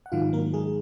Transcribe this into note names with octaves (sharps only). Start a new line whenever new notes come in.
F#5
G#2 D#3 F#3 F4 F5
A#3 A#4
G#3 G#4